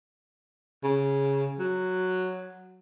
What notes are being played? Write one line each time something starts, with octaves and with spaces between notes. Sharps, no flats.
C#3
F#3